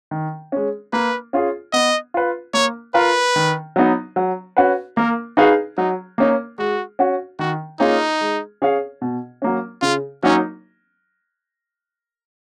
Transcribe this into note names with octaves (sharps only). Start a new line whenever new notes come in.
D#3
G#3 C#4
A#3 B4
C#4 F4 G#4
B3 D#5
F4 B4
A#3 C#5
F4 A#4 B4 F5
D#3
F#3 B3 D#4
F#3
C#4 F#4 B4
A#3 A#4
D#4 F#4 G#4 B4 F5
F#3 D#4
A#3 C#4 D#4
G#3 F#4
C#4 F#4
D#3 F#4
A#3 C#4 D#4 F4 G#4
G#3
C#4 G#4 C#5 F5
B2
F#3 A#3 C#4
C#3 F4
F#3 A#3 C#4 D#4